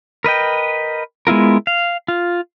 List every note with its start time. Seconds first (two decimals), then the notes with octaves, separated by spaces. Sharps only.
0.24 A#4 B4 D#5 G5
1.27 G#3 B3 E4 F4 A#4
1.67 F5
2.08 F4